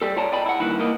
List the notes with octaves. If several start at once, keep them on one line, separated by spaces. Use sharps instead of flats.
G3 A4
F4 C#5 D5 A5 A#5
D5 D#5 G5 A5 B5
E4 F#5
G2 A#2 D#3 E3 E4 B4
E3 A#3 B3 D#4 D#5